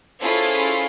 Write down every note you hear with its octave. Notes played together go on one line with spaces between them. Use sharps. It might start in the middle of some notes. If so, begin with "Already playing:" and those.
C#4 E4 F4 G#4 A4 C5